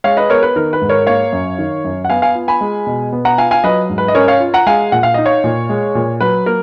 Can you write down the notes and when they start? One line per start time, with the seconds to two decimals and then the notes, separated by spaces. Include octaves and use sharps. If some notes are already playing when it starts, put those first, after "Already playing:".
0.04 G#3 C#5 F5
0.17 B4 D#5
0.30 B3 A#4 C#5
0.43 B4
0.56 D#3 A#4
0.73 B4
0.81 G#2
0.89 A#4 C#5
1.07 A#3 C#5 F5
1.32 F#2
1.58 D#3
1.84 F#2
2.05 F#5
2.10 B3 F5 G#5
2.22 F5 G#5
2.35 F4
2.48 G#5 B5
2.61 G#3
2.87 B2
3.12 B3
3.25 F#5 A#5
3.38 F4 F5 G#5
3.51 F5 G#5
3.64 F#3 B4 D#5
3.89 G#2
3.98 B4
4.08 D#5
4.15 C#4 A#4 C#5
4.28 C#5 F5
4.40 F4
4.54 F#5 A#5
4.67 G#3 F5 G#5
4.92 A#2 F#5
5.03 F5
5.14 D#4 D#5
5.26 C#5 F5
5.44 A#2
5.69 G#3
5.95 A#2
6.21 F#3 B4
6.46 A#3 A#4